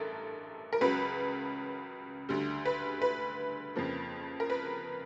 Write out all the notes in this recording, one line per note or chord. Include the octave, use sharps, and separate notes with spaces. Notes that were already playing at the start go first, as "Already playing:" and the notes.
Already playing: A1 G2 E3 A4 A#4
A#4
C#2 C#3 F#3 B4
D2 D3 G3
B4
B4
F2 C#3 F3 A#3
A#4
B4